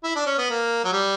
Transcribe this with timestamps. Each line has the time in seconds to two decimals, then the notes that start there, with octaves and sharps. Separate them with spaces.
0.04 E4
0.16 D4
0.26 C#4
0.38 B3
0.50 A#3
0.84 F#3
0.92 G3